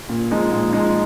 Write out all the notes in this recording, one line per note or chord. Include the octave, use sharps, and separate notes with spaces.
A#2
F3 G#3 D#4
A#2
F3 G#3 D#4